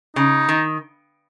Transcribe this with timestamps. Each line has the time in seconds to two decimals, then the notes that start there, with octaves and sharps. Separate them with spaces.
0.16 C#3 D#4
0.49 D#3